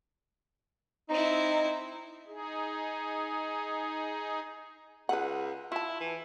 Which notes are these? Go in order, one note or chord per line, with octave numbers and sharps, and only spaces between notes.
C4 D#4 E4
D#4 G#4
C#2 B4 F#5
E4 F4 A5
E3